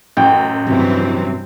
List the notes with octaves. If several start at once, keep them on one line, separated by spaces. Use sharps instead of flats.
A1 F#2 G5
G2 C3 E3 F#3 C4